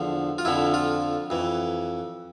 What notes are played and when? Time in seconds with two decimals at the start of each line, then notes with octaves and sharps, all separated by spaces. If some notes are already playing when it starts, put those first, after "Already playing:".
Already playing: E2 D3 F3
0.38 F4
0.45 F2 D3 F3 E4
0.74 F4
1.30 F2 E3